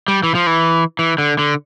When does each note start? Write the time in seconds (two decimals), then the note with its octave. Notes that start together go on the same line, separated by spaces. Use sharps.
0.08 G3
0.23 E3
0.35 F3
0.47 E3
0.99 E3
1.18 D3
1.39 D3